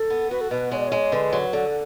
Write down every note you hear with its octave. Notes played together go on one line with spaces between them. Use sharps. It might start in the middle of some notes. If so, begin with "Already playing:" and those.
Already playing: A4
B3
F#4 B4
A4
B2 B4
G#3 C#5
D5
G#3 C#5
D3 B4
F#3
D3 A4